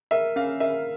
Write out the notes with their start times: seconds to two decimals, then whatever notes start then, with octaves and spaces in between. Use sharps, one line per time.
0.11 A#4 E5
0.36 C#4 F5
0.60 A#4 E5